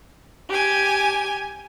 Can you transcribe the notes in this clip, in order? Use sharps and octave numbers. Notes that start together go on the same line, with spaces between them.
G4 G#5